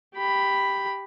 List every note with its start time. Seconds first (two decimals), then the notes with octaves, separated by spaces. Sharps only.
0.15 G4 B5